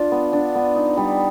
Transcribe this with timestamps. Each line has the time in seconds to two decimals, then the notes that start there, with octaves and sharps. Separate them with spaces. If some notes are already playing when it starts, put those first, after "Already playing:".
Already playing: D4 F4
0.12 B3
0.33 D4
0.55 B3
0.76 D#4
0.97 G3